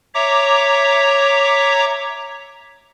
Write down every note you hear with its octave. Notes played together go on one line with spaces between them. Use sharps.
C#5 E5 A#5 D6